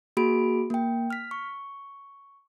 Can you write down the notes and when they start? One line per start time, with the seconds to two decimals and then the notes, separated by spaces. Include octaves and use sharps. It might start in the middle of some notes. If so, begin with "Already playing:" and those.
0.17 A#3 F#4 G#4 B5 D7
0.70 A#3 G5
1.10 F6 B6
1.31 C#6